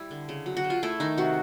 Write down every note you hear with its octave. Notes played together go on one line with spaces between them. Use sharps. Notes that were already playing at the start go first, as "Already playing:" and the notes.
Already playing: G3 E4
D3
C#3
F#3
F#4
C#3
F4
A3 E4
D#3 D#4
C3 F#4